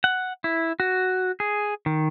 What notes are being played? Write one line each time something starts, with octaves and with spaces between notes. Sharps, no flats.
F#5
E4
F#4
G#4
D#3